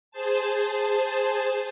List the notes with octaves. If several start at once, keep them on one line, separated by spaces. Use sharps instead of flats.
G#4 C5 A5